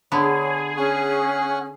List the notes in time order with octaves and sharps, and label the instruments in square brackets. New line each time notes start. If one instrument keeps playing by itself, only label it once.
[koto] D3 B3 [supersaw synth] G#4 [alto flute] C#5
[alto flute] C#4 [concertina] F#5 G#5 C#6